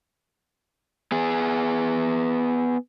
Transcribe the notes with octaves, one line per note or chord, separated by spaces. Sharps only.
B3 G#4